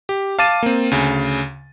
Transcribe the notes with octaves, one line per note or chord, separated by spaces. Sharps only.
G4
F5 A5 D6 A6 D#7
A#3 C4
D2 C#3